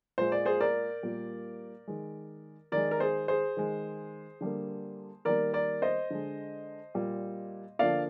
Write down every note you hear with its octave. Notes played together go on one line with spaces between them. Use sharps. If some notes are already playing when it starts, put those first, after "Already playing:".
A#2 G#3 C5
D5
G#4 C5
A#4 D5
A#2 G3 A#3
D#3 G#3
D#3 G#3 A#4 D5
A#4
G#4 C5
G#4 C5
D#3 G#3
D3 G3 A#3
D#3 G3 A#3 A#4 D5
A#4 D5
C5 D#5
D3 G#3
A#2 G3 A#3
D3 F3 A#3 D5 F5